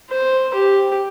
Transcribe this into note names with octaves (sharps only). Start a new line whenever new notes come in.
C5
G4